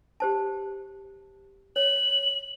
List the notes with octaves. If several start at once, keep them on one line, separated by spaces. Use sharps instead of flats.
G4 C5 A5
C#5 F#7